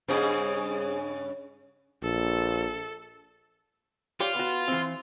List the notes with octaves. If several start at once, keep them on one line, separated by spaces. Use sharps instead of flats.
G2 C#3 C4 C#4 G#4
A#1 A4
F4 G4 C#5 D5
B3 F#4
E3 C4